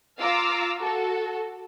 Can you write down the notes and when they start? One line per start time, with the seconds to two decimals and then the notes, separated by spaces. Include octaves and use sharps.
0.20 F4 F5 A#5 D6 E6
0.79 F#4 A4